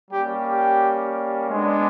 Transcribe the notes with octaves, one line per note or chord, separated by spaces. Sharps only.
G3 A#3 C#4 G4
G4
G#3 B3 D4